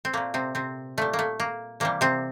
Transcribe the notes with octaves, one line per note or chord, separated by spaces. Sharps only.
C4
A#2 A3 A#3
C3 C4
C3 C4
A#2 G3 A3
A#3
A3
A#3
C3 E3 G3 A#3
C3 C4